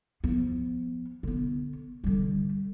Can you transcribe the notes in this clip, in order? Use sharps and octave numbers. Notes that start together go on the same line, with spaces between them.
F3 B3
D3 B3
D3 G3